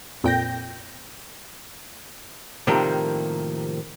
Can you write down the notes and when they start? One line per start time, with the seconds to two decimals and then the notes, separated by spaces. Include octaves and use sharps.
0.24 F2 A#2 G5 G6 A#6
2.67 A2 C3 D#3 F3 G3 A#3